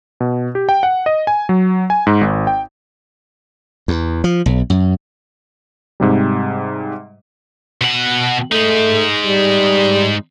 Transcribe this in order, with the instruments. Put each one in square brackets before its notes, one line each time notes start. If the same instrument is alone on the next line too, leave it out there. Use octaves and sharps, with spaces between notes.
[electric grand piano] B2
G4
G5
F#5
D#5
G#5
F#3
G#5
G#2
G#1
G5
[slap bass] E2
F3
B1
F#2
[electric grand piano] G#2 C3 G3
[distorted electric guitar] B2 F#5
[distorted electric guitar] G#3 D#4 [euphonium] A3
[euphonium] G3